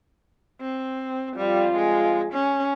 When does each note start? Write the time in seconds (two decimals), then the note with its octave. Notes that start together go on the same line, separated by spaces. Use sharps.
0.60 C4
1.36 F2 G3 F4
1.76 G#3
2.32 C#4